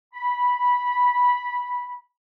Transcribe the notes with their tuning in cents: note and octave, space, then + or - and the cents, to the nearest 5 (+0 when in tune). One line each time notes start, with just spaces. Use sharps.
B5 -10